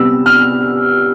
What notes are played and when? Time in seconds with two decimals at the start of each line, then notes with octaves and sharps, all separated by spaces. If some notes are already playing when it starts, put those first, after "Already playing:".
Already playing: C3 G3 B3 E6
0.26 F6